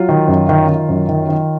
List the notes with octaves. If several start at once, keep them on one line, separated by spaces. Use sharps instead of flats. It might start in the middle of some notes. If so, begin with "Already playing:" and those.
Already playing: F#3 F4
D#3
F#2
D#3
D#3
F#2
D#3
D#3